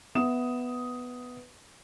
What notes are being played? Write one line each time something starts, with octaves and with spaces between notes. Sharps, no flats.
B3 E5 D#6 E7